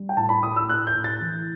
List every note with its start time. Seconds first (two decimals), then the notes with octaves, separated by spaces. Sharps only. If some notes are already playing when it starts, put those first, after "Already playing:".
Already playing: G3
0.09 G5
0.17 A2 A5
0.29 B5
0.42 A2 D#6
0.56 E6
0.68 A2 F#6
0.87 G6
0.95 A2
1.04 A6
1.21 E3